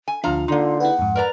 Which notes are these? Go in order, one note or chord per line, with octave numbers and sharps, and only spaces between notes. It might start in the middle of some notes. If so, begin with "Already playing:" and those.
G#5
D2 F3 D4 F4 F5 A#5
D3 A#3 D#4 C6
E4 G#4 B4 F#5
F2 G#2
A#4 B4 D5 A#5